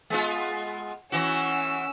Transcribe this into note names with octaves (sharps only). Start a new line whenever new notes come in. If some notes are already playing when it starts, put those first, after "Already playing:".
G#3 B3 F4
E3 C#4 F#4 E6